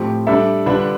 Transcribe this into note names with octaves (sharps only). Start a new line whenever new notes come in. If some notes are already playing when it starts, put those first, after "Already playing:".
Already playing: A2 F3 C4 G4
G3 D4 A4 E5
D3 G3 D4 F4 B4